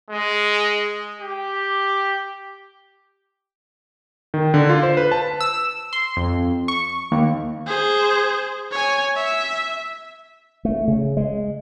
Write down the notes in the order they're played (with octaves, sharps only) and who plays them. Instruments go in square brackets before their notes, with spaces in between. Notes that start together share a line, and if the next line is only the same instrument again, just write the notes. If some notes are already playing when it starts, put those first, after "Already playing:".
[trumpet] G#3
G4
[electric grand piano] D#3
D3
F4
C5
B4
A5
[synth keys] E6
C6
F2
C#6
D#2
[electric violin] G#4 C5
C#5 G#5
E5
[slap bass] A3
C#3
G#3